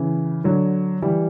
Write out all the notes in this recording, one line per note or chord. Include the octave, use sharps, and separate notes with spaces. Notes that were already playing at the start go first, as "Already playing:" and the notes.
Already playing: C#3 E3
D3 F#3
E3 G3